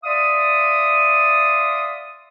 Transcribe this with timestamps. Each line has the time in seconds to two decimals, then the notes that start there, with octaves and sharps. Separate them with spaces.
0.04 D5 E5 F5 C6 D#6